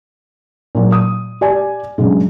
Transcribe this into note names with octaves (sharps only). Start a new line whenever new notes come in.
A#2 F#3
D#6
G4 D5 G#5
G2 C#3 F#3 G#3